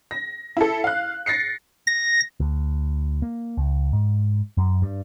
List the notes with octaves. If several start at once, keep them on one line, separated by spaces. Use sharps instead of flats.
A#6
E4 A4
F5 F#6
A6 A#6 C7 C#7
A#6
D2
A#3
C#2
G#2
F#2
G2